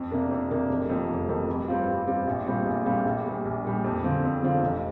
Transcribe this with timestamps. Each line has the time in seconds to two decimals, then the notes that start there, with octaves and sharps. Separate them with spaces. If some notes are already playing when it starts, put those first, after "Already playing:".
Already playing: F2
0.11 C3 A#3 D4
0.31 F2
0.50 C3 A#3 D4
0.70 F1
0.89 F2 F3 A#3
1.09 F1
1.29 F2 F3 A#3
1.48 G2
1.68 G3 C4 F4
1.88 G2
2.07 G3 C4 F4
2.27 A#1
2.46 A#2 G3 C4 F4
2.66 A#1
2.86 A#2 G3 C4 F4
3.05 A#1
3.25 A#2 G3
3.45 A#1
3.64 A#2 G3
3.84 F2
4.04 D3 F3 C4 F4
4.24 F2
4.43 D3 F3 C4 F4
4.63 F1